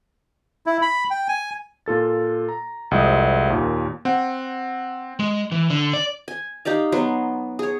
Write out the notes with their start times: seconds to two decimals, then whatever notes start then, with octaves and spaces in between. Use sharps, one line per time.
0.66 E4
0.82 B5
1.10 G5
1.28 G#5
1.86 A#2 F4 A4 A6
2.49 A#5
2.91 C2 F2 G#3 D#5 G5 D#6
3.50 D#2 A#2
4.05 C4 F#5
5.19 G#3
5.52 E3
5.70 D3
5.93 D5
6.28 G#5
6.65 D#4 G4 D5 F5
6.92 F#3 B3 C6
7.59 G#4 C#5